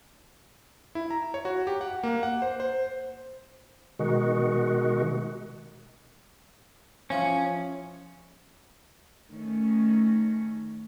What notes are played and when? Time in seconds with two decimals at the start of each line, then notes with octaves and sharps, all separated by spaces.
0.95 E4
1.11 A#5
1.34 C#5
1.45 F#4
1.67 G4
1.81 F#5
2.03 A#3
2.23 F#5
2.42 C5
2.60 C5
3.99 B2 D#3 G#3 F#4
7.10 E3 F3 C#4 F4
9.31 D#3 A3 C#4